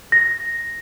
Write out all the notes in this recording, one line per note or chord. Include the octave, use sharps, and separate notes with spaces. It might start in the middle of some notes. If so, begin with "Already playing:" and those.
A#6